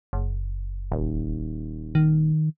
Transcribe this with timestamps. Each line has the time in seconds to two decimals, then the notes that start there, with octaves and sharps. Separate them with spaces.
0.13 F#1
0.92 D#1
1.95 D#3